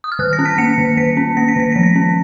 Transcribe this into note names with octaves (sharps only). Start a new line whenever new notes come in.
D#6
F6
D#3 F#6
A#6
C#4
B6
A#3 C#7
D#3
D#3 B6
C#4
A#3 A#6
B6
D#3 A#6
F3 B6
A#6
C#4